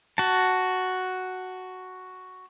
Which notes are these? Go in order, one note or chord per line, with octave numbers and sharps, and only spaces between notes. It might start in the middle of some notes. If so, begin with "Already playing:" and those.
F#4 A5